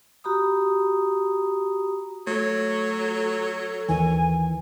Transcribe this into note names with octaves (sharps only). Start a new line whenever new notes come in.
F#4 G4 A#5 B5 D#6
F#3 A3 A4
D#2 D#3 E3 G#5